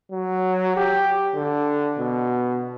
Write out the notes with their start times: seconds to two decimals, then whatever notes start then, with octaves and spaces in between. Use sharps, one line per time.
0.12 F#3
0.77 G4
1.35 D3
1.98 B2